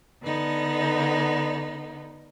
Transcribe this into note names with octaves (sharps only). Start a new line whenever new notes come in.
D3 B3 D#4